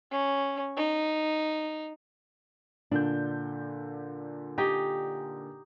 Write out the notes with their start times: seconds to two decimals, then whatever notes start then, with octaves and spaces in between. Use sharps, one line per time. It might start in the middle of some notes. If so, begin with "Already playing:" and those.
0.11 C#4
0.76 D#4
2.91 A#2 D3 D4 G6
4.58 D#4 G4 G5 G#5